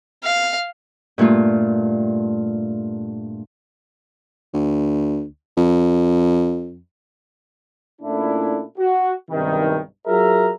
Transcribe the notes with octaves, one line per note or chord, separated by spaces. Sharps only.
F5
G2 A#2 A3 F4
D2
F2
A#2 A3 C#4 D4 E4
F#4
B1 G2 C3 D#3
F#3 F4 G#4 A#4 E5 A#5